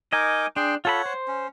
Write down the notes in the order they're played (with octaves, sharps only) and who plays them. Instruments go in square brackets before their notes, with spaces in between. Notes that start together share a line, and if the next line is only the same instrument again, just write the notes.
[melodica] D#4 A#4 D6 [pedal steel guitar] D#5 G#5
[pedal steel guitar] D4 [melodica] G#4 G5 C6
[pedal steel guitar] F4 A4 B5 [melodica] C#5 F#5
[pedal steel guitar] C5
[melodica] C#4